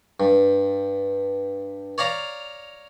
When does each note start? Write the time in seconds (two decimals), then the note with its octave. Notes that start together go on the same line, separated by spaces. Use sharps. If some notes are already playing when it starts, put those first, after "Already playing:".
0.20 G2
1.98 C#5 D5 F5 A#5